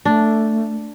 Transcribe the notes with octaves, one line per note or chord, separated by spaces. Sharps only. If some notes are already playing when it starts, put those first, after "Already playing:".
A3 D4